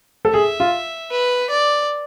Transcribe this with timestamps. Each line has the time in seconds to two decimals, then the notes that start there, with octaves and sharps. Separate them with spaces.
0.25 A4
0.34 G#4 E5
0.60 F4
1.11 B4
1.50 D5